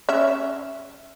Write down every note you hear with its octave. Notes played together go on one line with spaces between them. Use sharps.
C#4 E5